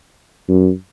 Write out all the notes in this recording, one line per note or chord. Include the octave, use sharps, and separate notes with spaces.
F#2